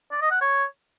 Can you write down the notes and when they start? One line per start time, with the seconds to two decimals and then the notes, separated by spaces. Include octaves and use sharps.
0.12 D5
0.21 D#5
0.31 F#5
0.41 C#5